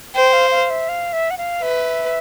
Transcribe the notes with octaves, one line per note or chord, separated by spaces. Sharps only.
C5 G5
F5
F5
E5
F5
E5
F#5
F5
B4 E5